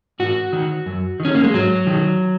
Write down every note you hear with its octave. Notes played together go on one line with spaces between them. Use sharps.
G#2 F#4
D#3
F#2
D#3
C#4
A#3
G#3
G#2 F#3
D#3